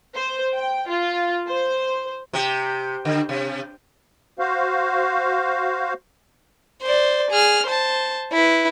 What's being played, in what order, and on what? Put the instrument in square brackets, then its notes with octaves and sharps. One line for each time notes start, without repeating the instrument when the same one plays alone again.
[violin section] C5
G5
F4
C5
[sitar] C3 G4
D3
C3
[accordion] F#4 C5 F5
[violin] C5 D5
G#4 F6
C5 A5
E4 B4